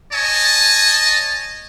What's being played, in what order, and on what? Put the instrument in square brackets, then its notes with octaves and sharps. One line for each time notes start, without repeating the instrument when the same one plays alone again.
[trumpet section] C#5 D#5 G#5 A5